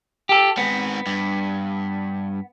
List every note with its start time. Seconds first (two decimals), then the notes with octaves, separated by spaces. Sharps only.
0.29 G4 A4
0.58 G#2 B3 C4
1.07 G2